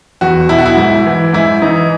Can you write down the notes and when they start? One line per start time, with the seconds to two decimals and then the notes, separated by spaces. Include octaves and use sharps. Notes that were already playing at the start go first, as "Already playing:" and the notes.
0.21 E2 F#4
0.49 B2 E4
0.58 F#4
0.66 E4
0.77 G#2 E4
1.06 E3
1.34 G#2 E4
1.62 E3 D#4